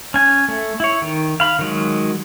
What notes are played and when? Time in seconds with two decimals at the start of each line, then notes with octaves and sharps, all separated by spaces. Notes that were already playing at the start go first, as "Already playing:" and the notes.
0.14 C#4 G#5
0.48 A3
0.80 E4 C#5
1.02 D#3
1.40 F5 B5
1.59 D#3 F#3 G#3